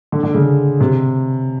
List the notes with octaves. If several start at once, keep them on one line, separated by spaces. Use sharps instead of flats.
D3
D3
C#3
C3